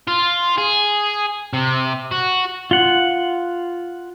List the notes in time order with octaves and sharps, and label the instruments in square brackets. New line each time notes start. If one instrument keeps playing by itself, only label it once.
[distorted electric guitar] F4
G#4
C3
F#4
[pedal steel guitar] F4 F#5